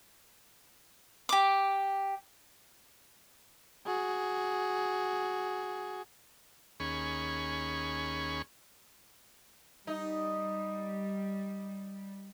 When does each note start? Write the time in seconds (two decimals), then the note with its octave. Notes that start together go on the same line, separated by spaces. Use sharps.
1.29 G4 D6
3.86 F#4 G#4
6.80 D#2 C#4 G#4 B5 C#6
9.87 G3 D#4